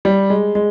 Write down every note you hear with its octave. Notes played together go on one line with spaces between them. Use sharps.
G3
G#3
G#3